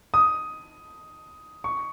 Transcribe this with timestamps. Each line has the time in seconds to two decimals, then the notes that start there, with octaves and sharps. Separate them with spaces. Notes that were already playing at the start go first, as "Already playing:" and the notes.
0.14 D#6
1.64 C#6